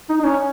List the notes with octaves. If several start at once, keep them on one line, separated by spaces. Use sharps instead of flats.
D#4
D#4
C#4